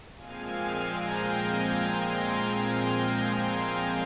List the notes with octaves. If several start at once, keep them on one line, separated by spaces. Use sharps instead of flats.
A#2 F3 G#3 C4 F5 G#5
G5 A#5
G#5 C6